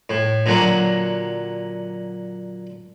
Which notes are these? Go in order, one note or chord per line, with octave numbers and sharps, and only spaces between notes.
A2
A#2 D3 F#3 A#3